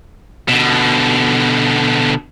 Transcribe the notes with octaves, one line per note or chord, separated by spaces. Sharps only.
B2 D3